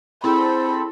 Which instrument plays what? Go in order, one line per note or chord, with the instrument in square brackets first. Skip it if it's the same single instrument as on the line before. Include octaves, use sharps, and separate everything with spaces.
[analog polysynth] C4 A4 [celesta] E4 G#4 C6 [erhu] B5